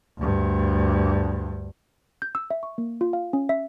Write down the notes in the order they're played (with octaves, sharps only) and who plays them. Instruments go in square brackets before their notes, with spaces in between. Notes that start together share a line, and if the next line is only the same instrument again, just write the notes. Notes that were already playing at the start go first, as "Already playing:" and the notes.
[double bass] D2 G2
[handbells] G6
E6
E5
C#6
A#3
F4
F5
C#4
E5